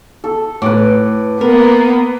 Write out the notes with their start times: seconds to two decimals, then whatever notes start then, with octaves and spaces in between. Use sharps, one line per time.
0.24 A4
0.62 A2 B4 D6
1.41 A#3 B3 A#4